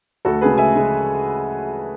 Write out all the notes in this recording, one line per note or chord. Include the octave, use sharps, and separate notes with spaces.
D2 F#4 A4
C#3 G#3 G#4 B4
D2 E5 G#5
C#3 G#3